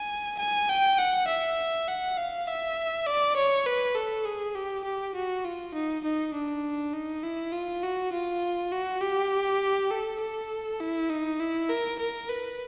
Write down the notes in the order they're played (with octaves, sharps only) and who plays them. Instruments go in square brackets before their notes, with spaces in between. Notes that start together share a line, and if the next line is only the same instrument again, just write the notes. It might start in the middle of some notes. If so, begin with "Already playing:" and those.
Already playing: [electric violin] G#5
G#5
G5
F#5
E5
F#5
F5
E5
D5
C#5
B4
A4
G#4
G4
G4
F#4
F4
D#4
D#4
D4
D#4
E4
F4
F#4
F4
F#4
G4
A4
A4
E4
D#4
E4
A#4
A#4
B4